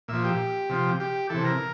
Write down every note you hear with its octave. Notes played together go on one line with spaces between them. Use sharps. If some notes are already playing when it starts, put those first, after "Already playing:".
A#2 F3 E5
G4
C3 F3
G4
C3 E3 A4
A#4